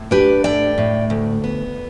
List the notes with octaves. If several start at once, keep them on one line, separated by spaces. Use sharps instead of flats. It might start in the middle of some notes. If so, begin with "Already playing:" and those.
Already playing: A2
D4 G4 B4
A2 D5 G5
A2
D2
B3